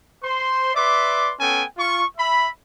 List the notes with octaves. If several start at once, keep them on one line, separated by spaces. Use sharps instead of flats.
C5 C6
B4 D5 E5 C6 D6
B3 C#4 A4 G5 G#5
F4 C#6
E5 B5